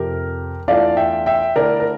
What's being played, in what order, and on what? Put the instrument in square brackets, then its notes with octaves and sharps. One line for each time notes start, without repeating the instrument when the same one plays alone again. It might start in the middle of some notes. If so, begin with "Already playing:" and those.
Already playing: [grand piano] F2 C3 F3 G4 A#4
E2 E3 A3 D4 F4 D5 F5
E5 G5
E5 G5
D3 A3 E4 A#4 D5
A#4